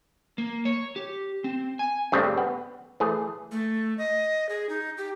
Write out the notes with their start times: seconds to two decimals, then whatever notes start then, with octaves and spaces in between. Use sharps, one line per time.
0.38 A#3
0.65 C#5
0.96 G4
1.44 C4
1.79 G#5
2.12 G2 C#3 A3 C4 D4
2.38 B3
3.00 E3 A3 G#4
3.52 A3
3.98 D#5
4.49 G#4
4.69 D#4
4.98 G4